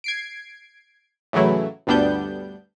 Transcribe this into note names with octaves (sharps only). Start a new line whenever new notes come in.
G#6 C7 D7
A2 C#3 E3 F#3 A3 E4
G1 D2 G3 B3 D4 G6